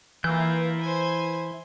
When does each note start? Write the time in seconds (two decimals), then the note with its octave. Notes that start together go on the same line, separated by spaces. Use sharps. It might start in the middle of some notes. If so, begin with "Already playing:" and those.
0.24 E3 A#3 E4 F4 G6
0.81 C5 G#5